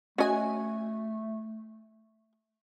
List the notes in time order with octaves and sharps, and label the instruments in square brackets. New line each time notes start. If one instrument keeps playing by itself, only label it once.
[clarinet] A3 [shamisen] C#4 D#5 [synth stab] F#4 G#5